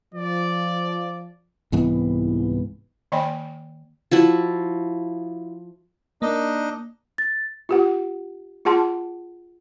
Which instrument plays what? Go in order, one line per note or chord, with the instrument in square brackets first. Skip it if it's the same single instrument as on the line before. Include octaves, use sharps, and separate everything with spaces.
[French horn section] F3 [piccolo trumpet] D5
[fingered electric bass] C2 G#2 E3 B3
[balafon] D#3 A#3 D5 D#5 G5 B5
[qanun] F3 E4 F#4
[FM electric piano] A#3 [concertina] D4 D#4 D#5
[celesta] A6
[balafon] F4 G4 F#5
F4 G#4 F#5 A5 C6